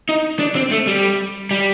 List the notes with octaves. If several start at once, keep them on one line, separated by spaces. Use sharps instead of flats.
D#4
D4
C4
A3
G3
G3